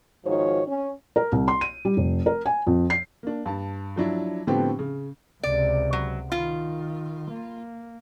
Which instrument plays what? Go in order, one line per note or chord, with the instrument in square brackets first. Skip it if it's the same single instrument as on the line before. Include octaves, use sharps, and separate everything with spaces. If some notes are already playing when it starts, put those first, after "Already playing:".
[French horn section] G#2 D#3 F3 F#4 C#5
C#4
[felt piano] A#4
C2
C6
D#7
G3
F1
A#4
G#5
F2
C7
[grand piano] A#3 D4
G2 A5
F3 F#3 D4 E4
A2 D3 F3 B3 C4 G4
C#3
[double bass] C#2 C3 [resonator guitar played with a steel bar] D5
[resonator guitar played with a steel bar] F#3
[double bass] D#3 [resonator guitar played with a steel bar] F4
[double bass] A#3